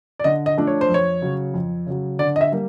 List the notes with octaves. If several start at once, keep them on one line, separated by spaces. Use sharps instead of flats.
D5
D3 D#5
D#5
F3 A3 D4
C#5
C5
F2
C#5
C#3 F#3
F2
C#3 F#3
D3 D5
D#5
E5
G3 A#3